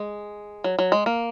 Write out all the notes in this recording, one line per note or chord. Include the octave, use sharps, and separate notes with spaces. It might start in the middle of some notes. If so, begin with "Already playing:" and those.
Already playing: G#3
F#3
F#3
G#3
A#3